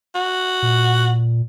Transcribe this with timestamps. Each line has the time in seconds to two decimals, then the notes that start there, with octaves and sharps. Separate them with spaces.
0.15 F#4
0.62 A#2